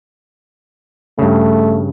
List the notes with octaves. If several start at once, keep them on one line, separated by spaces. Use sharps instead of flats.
G2 C#3 A3